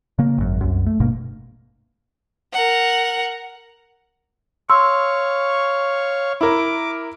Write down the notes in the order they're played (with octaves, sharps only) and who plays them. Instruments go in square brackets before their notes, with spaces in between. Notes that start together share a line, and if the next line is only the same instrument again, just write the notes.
[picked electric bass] C#3 A#3
G#1 F#2
C2 F#2
A3
G1 G2 B2 A#3
[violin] A#4 F#5
[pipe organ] C#5 F5 C#6 [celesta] C6 E6
[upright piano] E4 A#4 [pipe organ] D6